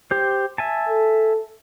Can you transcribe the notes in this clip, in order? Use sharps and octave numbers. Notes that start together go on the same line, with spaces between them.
G4 C5
E5 G#5 A5
A4